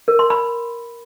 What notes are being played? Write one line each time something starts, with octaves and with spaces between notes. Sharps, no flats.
A#4
C6
B5